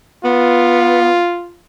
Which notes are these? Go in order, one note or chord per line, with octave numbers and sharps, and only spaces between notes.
B3 F4